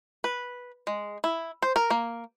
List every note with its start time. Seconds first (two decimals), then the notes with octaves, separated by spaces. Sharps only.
0.24 B4
0.87 G#3
1.24 E4
1.62 C5
1.76 A#4
1.90 A#3